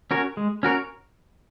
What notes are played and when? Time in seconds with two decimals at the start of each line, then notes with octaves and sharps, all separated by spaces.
0.11 C#4 F#4 A#4 C#5
0.37 G#3
0.63 C#4 F#4 A#4 C#5